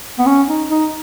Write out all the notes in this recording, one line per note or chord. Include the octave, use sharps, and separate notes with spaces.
B3
C#4
D#4
D#4